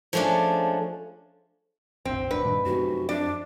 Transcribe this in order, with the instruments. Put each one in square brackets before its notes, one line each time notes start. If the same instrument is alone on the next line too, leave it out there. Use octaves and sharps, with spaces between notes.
[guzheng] F3 G#3 A3 C#4 D4
[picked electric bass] F1 A#1 [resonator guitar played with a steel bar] C4
[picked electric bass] D1 D4 [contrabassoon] D3 [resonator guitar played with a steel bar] B4
[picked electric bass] G2 A#2 D#3
[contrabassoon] F1 [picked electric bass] F#2 [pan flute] F#4
[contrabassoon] F2 [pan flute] D4 [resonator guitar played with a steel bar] D5